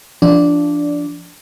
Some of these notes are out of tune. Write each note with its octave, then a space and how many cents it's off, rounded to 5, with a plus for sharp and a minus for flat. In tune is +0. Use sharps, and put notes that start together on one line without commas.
F3 -25 D4 -5